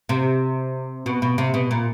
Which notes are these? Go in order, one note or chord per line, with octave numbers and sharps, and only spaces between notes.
C3
B2
B2
C3
B2
A#2